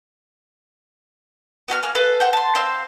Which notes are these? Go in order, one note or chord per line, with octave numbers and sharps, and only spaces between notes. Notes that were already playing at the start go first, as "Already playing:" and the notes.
B3 F#4 G#5 F6
A#3 G#4 F6
A4 B4 F5
C5 F#5 G5
A5 C6
C4 F5 C6 E6